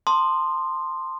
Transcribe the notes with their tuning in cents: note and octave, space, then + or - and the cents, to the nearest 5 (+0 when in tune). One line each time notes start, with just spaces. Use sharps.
A5 +35 C6 +0 D#6 -40